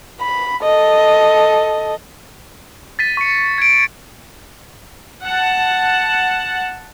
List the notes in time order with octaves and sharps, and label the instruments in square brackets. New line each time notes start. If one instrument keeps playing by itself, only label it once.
[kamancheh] B5
A4 D#5
[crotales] A6 B6 D#7
C#6 C#7
G#6 D7
[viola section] F#5 A5